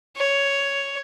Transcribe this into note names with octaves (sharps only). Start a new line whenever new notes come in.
C#5